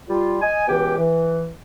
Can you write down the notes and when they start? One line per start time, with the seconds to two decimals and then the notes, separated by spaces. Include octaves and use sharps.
0.09 G3 F4
0.41 D#5 G#5
0.67 C#2 B2 E3 G4 G5
0.97 E3